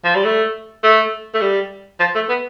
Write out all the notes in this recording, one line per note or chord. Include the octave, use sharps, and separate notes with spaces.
F3
G3
A3
A3
A3
G3
F3
A3
B3